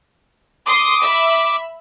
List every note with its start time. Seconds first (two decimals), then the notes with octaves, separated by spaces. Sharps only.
0.66 C6 D6 D#6
1.02 E5 B5